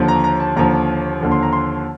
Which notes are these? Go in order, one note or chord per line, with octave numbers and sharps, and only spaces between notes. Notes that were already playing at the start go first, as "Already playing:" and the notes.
Already playing: D#2 D3 F3
A#5
A#5
A5
D#2 D3 F3 A#5
D#2 D3 F3
C6
A#5
C6